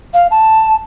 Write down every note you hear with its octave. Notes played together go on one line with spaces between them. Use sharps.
F5
A5